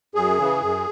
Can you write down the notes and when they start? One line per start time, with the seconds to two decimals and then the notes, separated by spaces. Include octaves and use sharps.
0.15 F#2 G#4
0.38 C#3 E3
0.62 F#2